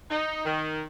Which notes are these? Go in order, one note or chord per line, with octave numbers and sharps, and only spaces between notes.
D#4
D#3